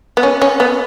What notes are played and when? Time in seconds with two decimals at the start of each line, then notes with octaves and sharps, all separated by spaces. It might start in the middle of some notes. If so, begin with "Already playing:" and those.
0.17 B3
0.23 C#4
0.42 C#4
0.60 B3